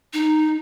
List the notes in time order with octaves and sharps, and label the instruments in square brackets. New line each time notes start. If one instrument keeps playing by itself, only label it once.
[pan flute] D#4